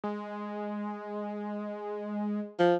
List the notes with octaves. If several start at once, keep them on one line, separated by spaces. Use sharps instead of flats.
G#3
F3